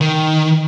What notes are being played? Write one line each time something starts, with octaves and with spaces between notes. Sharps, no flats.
D#3